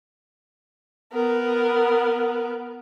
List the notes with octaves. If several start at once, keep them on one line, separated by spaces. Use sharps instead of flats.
B3 A#4